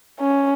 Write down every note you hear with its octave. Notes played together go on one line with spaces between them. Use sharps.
C#4